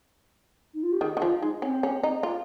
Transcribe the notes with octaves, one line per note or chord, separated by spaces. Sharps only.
D#4
F4
G4
D#3 G#4
D#3
F3 F4
G#3 D#4
C4 C#4
C#4
D#4
F4